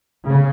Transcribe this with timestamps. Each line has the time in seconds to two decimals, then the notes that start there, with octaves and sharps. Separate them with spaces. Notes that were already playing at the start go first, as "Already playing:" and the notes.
0.25 C#3